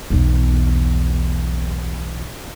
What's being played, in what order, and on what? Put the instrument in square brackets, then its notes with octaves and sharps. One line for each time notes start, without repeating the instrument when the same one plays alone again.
[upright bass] B1 E2